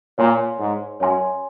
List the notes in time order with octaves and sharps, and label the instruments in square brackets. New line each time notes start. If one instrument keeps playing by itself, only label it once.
[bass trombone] A#2 [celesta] C#5 G#5 C6
[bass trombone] G#2
[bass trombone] F#2 [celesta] C#5 G#5 C6